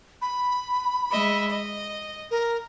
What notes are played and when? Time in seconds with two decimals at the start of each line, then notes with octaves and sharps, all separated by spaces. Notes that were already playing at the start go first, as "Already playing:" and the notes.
0.22 B5
1.11 G#3 D#5 E5
1.50 D#5
2.31 A#4